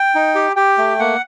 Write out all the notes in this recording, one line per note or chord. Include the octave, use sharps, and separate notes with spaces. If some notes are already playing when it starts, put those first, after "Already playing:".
Already playing: G5
D#4
G4
G4 G5
A3
A#3 F#5